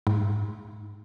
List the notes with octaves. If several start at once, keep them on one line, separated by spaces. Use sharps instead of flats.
G#2